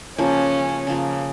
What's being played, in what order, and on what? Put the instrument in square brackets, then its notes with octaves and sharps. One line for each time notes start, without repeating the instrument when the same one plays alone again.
[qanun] C#3 F3 A#3 [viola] C#4
[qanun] C#3 F3 A#3